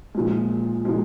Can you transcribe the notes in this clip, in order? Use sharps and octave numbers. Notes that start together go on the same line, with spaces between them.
A#2 F3 G#3
A#2 F3 G#3